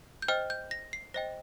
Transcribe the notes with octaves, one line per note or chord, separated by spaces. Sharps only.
G6
C5 D#5 G5 F6
G6
A#6
C7
C5 D#5 G5 A#6